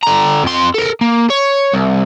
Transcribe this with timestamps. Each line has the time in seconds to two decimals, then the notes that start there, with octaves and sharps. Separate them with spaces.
0.03 D3 A#5
0.43 F2 C6
0.75 A4 A#4
1.01 A#3
1.30 C#5
1.73 C2